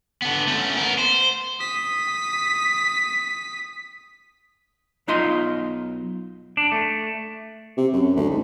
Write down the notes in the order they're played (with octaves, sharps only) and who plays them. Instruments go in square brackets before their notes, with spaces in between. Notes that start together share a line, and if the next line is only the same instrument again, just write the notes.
[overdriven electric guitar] D3 B3
A3 C#4
B3 A#4
C5
[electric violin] D#6 B6
[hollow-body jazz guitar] B1 B2 D#4 F4 D#5 C6
[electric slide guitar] D4
A3
[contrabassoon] C3
F#2
D2
G#2